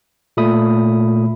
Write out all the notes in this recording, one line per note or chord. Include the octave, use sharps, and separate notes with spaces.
A#2 A3 B5 D#6